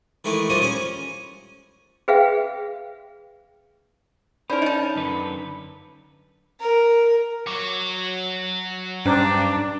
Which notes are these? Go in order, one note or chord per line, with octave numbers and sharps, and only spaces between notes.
D#3 E3 G#3 A3
A#2 F3 G3 A#3 D#5 D#6
C#4 G#4
G#4 B4 E5 F5 G5
C#4 D#4 A#4 C5 D5 B5
D#4 D#5 A5
F#2 D3 B4
A#4
F#3 C#5 D6
G2 C#4 D4 C5 A#5